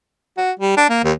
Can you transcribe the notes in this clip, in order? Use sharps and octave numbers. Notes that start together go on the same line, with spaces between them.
F#4
G3
D4
A#3
D#2